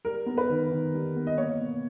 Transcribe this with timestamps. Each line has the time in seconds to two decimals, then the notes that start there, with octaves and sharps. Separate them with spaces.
0.05 G3 A#4
0.26 B3
0.38 B4
0.49 D#3
0.71 D#3
0.94 G3
1.16 B3
1.27 D#5
1.38 A#3 C#5
1.61 B2